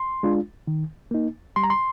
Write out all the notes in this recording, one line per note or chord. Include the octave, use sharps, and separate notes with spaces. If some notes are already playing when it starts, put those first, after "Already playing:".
Already playing: C6
G#3 D4 F4
D#3
A#3 D#4
G3 C6
A#5
C6